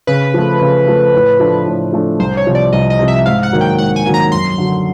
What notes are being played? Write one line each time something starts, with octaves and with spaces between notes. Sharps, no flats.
C#3 B4
F3 A3
C#3
F3 A3
A2
F3 A3 D4
A2
F3 A3 D4
C2 C5
C#5
C3 F3
D5
C2 D#5
D#5
C3 F3
E5
G#2 F5
F#5
D#3 F#3 A#3
G5
G#2 F#5
G#5
D#3 F#3 A#3
A#5
F#2 C6
D3 F#3